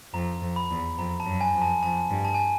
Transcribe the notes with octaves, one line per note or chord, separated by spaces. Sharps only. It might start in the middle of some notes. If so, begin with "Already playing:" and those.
F2 A#5
F2
B5
E2
F2 A#5
A5
F#2
G#5
F2
A5
F2 A5
G2
A5
G#5